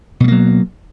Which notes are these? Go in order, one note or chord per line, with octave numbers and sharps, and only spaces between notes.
B2 F#3 G3 A#3